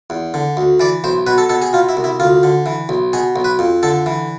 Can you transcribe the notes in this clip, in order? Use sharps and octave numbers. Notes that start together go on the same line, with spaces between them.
E2
D3
D2
E3 D5
B1 C5
B2 B4
A4
B2 A4
G#4
B2 F4
E4
C2
E4
D2 F4
D3
E3
B1
B2 G#4
B1
B4
F2
D3 A4
E3